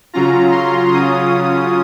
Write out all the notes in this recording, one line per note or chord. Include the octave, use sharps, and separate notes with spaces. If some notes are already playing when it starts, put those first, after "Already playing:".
C#3 F#3 C#4 F4 A#5
C6
C#3 F#3 C#4 F4 D#6